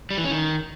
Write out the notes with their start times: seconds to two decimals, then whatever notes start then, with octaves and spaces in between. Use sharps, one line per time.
0.11 G3
0.17 E3
0.24 C#4
0.31 D#3